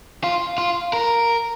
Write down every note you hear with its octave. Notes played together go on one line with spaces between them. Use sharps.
F4
F4
A#4